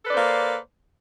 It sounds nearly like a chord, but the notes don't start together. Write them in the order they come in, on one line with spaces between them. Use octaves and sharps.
A4 B4 D5 C5 A#3